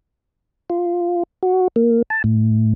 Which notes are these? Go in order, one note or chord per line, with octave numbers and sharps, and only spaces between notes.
F4
F#4
A#3
A5
A2